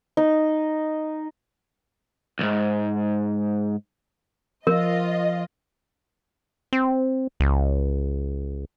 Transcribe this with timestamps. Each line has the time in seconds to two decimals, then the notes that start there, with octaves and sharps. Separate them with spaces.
0.17 D#4
2.39 B1 G#2
4.67 F3 F4 A#4 D#5
6.73 C4
7.40 C#2